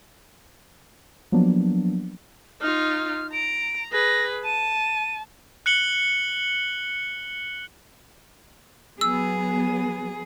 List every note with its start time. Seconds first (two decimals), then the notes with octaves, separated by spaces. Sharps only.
1.32 F3 F#3 A#3 B3 D4
2.62 D#4 F4 F6
3.33 A#5 D7
3.92 G#4 B4 A#6
4.45 A5 D#7
5.66 F#6 C#7 F#7 G7
9.01 F#3 B3 G#4 E6